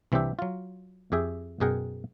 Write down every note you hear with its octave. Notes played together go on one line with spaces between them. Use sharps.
C2 E3 C4 D4 G4 E5
F#3 F4
F2 G4 G#4 E5 G5
F#2 B2 G#4 A#4 F#5 G5